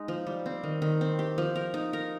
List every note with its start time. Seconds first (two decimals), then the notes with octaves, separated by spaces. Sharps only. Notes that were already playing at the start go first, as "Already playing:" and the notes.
Already playing: G#3 D#4
0.08 F3
0.27 G3
0.46 C4
0.64 D#3
0.82 D#3
1.01 C4
1.19 G4
1.38 F3
1.55 A#4
1.74 D#4
1.93 A#4